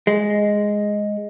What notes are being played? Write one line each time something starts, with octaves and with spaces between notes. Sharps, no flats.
G#3